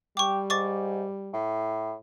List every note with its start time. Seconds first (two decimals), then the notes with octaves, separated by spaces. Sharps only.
0.17 G3 G4 C#6 D6
0.50 G#2 C#6 D6 A6
1.33 A2